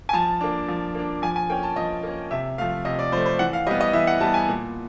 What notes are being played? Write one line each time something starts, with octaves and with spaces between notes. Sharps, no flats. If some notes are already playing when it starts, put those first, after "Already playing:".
G#5
F3 A5
A#3 D4
F3
A#3 D4
F3 G#5
G#5
A#3 C#4 G5
A5
F3 D#5
A#3 C#4
C3 E5
F3 A3 F5
C3 D#5
D5
F3 A3 C5
C5
E3 F#5
F5
G3 B3 D#5
D#5
E3 E5
F#5
G3 B3 A5
G#5
A#2